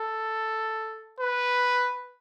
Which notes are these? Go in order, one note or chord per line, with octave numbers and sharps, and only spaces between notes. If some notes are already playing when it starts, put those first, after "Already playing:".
Already playing: A4
B4